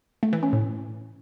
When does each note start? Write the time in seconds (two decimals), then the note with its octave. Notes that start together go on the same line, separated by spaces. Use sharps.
0.23 A3
0.33 E3
0.43 C#4
0.53 A2